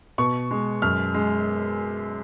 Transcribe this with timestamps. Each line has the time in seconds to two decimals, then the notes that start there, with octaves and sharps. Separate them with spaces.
0.18 B2 C#6
0.51 G#3
0.82 F#2 F6
1.14 G#3